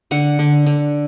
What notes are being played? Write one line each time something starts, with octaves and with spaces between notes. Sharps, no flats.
D3 F#5
D3
D3